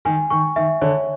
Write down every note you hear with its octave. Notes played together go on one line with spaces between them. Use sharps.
D#3 G#5
D#3 C#6
D#3 E5
D3 C#5